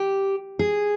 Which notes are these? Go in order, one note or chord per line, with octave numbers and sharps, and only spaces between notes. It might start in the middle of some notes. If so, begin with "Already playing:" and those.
Already playing: G4
G#4